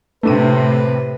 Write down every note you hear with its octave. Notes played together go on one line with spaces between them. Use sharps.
A2 C3 A3 D4 B4 D#7